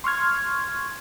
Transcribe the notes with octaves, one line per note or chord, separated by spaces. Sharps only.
C6 C#6 F6 G#6